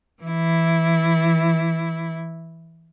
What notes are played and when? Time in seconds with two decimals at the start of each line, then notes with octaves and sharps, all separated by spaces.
0.23 E3 E4